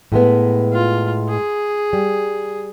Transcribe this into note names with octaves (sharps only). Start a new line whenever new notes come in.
A2 G#3 B3
F4
G#4
G3